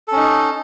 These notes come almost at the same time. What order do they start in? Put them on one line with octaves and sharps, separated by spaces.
A4 C#4 D#4